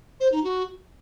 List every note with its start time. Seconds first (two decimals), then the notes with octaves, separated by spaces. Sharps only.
0.20 C5
0.32 D#4
0.44 F#4